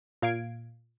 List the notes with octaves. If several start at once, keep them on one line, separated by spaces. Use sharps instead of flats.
A#2 F5 G#6 D7